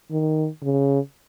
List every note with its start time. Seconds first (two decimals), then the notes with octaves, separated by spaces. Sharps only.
0.11 D#3
0.63 C#3